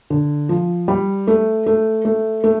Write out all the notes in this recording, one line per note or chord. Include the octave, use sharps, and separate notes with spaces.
D3
F3
G3
A3
A3
A3
A3